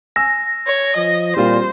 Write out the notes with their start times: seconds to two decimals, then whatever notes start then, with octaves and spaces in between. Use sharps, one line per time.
0.16 G#5 E6 A#6
0.66 C#5
0.97 F3 D#5
1.37 A#2 G3 C4 F4 C5